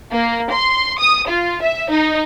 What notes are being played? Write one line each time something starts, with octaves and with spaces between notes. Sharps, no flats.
A#3
C6
D#6
F4
E5
D#4